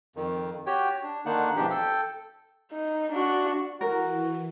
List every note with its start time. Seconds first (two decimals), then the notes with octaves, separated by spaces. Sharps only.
0.16 F2 D#3
0.66 F#4 G4 C#5 G5
1.03 D4
1.25 D3 D#3 A#3 D4 D#4 F#5
1.56 G#2 B2 E3 F3 D4 G4
1.70 A4 G5
2.72 D#4
3.13 D4 F#4
3.81 E3 F#4 A#4